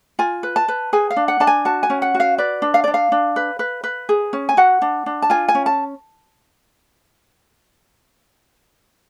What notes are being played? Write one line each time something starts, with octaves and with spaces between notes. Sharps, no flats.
F4 G#5
B4
A5
B4
G#4 G#5
F5
D4
F#5
D4 A5
G#5
F#4 A5
G#5
C#4
F#5
F#4
F5
B4 D5
D4
F5
D4 D5
F5
D4
B4
B4
B4
G#4
C#4
G#5
F#4 F#5
D4
D4
A5
F4 G#5
G#5
C#4
A5